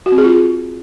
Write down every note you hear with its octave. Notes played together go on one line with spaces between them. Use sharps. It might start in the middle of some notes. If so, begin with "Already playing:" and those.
F#4
C4
G#4
F4